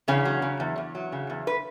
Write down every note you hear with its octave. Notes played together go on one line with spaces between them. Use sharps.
E2 C#3 C#4
F#3
C#3
E2
E2
F#3
C#3
E2
B4